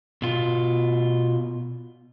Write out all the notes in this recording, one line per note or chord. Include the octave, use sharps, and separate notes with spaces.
B2 F4